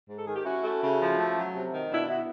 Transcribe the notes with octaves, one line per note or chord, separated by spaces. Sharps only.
G#2
A4
D#3 G#4
G4
C#4 E4 F#4
A3
C#3
F3
A3
F#3
C3
D#3
B2 D4 E4
B3 E4 F#4